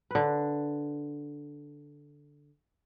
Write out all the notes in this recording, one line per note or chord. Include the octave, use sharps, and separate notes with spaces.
D3 B4